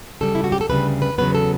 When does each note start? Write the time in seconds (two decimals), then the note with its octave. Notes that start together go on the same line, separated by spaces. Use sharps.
0.21 D2 C#3 G3 A4
0.35 E4
0.44 F#4
0.52 G4
0.61 A4
0.69 D2 C#3 G3 B4
1.02 B4
1.18 E2 C#3 F#3 B3 B4
1.35 A4